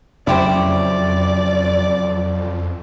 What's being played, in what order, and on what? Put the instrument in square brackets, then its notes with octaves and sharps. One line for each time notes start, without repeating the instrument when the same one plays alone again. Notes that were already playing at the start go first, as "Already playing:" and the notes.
[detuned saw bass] F2 [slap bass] C#3 F#3 C#4 [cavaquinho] E4 G4 C5 [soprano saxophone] D5